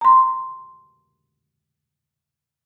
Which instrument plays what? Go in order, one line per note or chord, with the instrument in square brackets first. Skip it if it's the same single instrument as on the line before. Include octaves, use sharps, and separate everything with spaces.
[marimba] A#5 C6